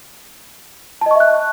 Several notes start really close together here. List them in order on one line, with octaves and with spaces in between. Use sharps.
A5 D#5 C#6 E5 F#6